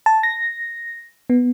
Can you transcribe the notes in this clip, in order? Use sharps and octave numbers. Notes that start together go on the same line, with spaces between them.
A5
A#6
B3